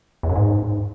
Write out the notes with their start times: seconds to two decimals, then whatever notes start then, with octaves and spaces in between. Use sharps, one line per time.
0.23 E2
0.29 F#2
0.36 G#2